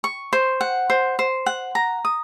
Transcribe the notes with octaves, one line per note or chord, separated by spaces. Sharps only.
C#6
C5
F#5
C5
C5
F#5
A#5
D#6